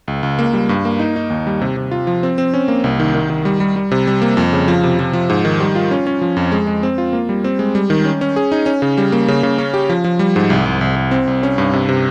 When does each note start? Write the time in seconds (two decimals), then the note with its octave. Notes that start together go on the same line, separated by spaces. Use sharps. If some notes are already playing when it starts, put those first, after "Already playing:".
0.08 C#2
0.23 C#2
0.39 A#3
0.54 G3
0.69 G2
0.85 A#3
0.99 D#4
1.16 D#4
1.30 D#2
1.47 G3
1.61 C3
1.77 C3
1.91 F4
2.07 F3
2.23 C4
2.38 C4
2.54 C#4
2.68 A#3
2.84 C2
3.00 D#3
3.14 D#3
3.30 D#3
3.45 G3
3.60 G3
3.76 G3
3.91 C3
4.07 G3
4.22 A#3
4.37 F2
4.53 C#3
4.68 F3
4.83 C3
4.99 F3
5.13 F3
5.30 G#2
5.45 D#3
5.60 G3
5.75 F4
5.91 C#4
6.07 C#4
6.21 F3
6.37 F2
6.52 G#3
6.67 G#3
6.83 C4
6.98 F4
7.13 A#3
7.29 G3
7.44 C4
7.59 G#3
7.75 G3
7.90 D#3
8.05 C#4
8.21 C#4
8.36 G#4
8.52 D#4
8.66 C#4
8.82 C#3
8.98 G3
9.12 A#3
9.28 C#3
9.43 C#3
9.58 C#4
9.74 G4
9.89 F3
10.04 F3
10.19 G3
10.36 G#2
10.50 C2
10.66 C2
10.81 C2
10.96 C2
11.11 C4
11.27 C2
11.43 C#4
11.58 G2
11.73 C3
11.89 C3